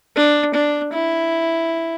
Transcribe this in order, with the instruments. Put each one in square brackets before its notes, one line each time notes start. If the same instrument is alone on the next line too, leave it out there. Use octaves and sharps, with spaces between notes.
[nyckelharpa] D4
D4
E4